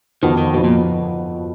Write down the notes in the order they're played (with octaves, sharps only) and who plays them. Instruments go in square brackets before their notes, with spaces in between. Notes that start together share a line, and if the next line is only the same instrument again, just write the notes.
[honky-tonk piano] F2 F3 B3 F#4 [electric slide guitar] D#3
[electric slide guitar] D#3
[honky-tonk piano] F2 F3 B3 F#4 [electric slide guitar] B2
[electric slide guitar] A#2